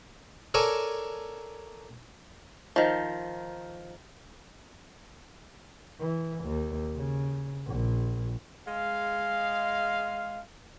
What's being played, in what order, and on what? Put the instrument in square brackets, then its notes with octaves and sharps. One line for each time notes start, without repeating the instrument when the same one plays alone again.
[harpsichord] A4 A#4 C#5 D5 G#5 A5
[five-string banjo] D#3 F3
[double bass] E3
D#2
C#3
A#1
[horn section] G#3 F5